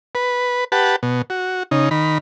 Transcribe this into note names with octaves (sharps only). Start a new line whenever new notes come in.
B4
G4 B4 F#5 A5
B2
F#4
C#3 D#4
D#3 B5